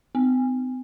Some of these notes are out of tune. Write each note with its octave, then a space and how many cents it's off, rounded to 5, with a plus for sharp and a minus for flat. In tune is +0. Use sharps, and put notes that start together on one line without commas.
C4 -45